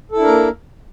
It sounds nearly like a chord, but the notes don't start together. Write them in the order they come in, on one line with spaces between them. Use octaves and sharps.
A4 E4 D4 A#4 A#3